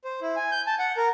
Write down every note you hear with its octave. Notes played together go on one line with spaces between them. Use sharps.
C5
E4
G#5
G6
A5
F#5
A#4